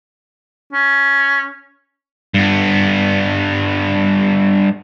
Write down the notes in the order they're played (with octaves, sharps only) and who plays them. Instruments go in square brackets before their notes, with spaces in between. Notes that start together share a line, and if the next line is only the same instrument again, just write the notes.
[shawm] C#4
[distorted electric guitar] G2 B3